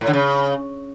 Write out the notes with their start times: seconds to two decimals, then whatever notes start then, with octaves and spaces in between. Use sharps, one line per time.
0.01 A2
0.07 D3
0.13 C#3